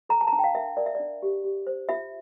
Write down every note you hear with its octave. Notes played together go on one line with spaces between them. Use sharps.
A4 A#5
A5
A#5
D4 A5
G5
F5
A#4 E5
A#4 D5
E5
D4 D5
G4
G4
C5
F4 E5